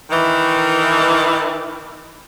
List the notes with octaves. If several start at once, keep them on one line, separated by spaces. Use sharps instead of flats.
D#3 E3